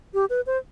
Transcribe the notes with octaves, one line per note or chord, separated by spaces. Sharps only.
G4
B4
C5